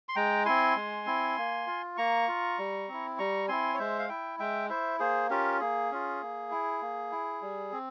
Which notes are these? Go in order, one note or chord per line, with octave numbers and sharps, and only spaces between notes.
C6
G#3 G5 A#5
C4 E4 G#5 C6
G#3
C4 E4
A#3
F4
A#3 A#5 C#6
F4
G3
C4 E4
G3 A#5 C#6
C4 E4 G#5 C6
C#5
G#3 C5 E5
F5
E4 E5 G5
G#3 E5 G5
E4 C5 E5
A#3 G#4 C5
C#4 F4 G4 A#4
A#3 G#4
C#4 F4
A#3
E4
A#3
E4
G3
C4